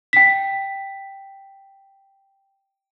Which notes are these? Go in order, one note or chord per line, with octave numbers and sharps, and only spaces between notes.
G5 B6